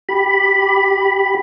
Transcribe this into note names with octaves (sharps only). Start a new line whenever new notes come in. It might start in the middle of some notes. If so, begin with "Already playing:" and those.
G4 B5